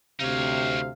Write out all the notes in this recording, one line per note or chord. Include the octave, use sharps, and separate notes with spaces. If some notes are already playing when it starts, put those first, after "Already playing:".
D2 C3 D#4 C#5 F5